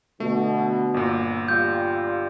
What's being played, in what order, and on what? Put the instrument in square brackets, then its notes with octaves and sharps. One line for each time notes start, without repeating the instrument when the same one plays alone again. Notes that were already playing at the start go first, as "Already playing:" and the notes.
[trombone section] B2 D3 [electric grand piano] A3
[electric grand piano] G1 A#2
[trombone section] G3 F4 [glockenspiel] G6